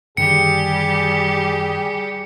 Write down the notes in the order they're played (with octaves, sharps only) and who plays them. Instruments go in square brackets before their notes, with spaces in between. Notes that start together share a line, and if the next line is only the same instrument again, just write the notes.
[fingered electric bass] F#2 D3 D#3 [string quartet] G3 G4 [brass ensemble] G#4 [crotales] C#7